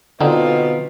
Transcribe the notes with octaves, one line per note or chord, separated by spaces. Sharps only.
B2 D3 C4 D#4 F4